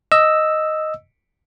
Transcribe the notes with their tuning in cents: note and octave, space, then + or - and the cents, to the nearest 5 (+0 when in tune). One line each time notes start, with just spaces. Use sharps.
D#5 +0 E6 +0